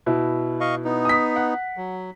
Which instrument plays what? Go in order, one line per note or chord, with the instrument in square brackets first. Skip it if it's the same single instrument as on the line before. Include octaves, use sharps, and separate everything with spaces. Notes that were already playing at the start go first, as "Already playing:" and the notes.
[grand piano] B2 E4
[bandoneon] D#5 F5 C#6
B3 D#4
[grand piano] D#6 B6
F#5
[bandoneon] F#3